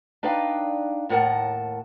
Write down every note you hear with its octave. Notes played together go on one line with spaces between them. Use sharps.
D4 D#4 B4 D5 F5 G5
D#2 A2 B3 A#4 F#5 A5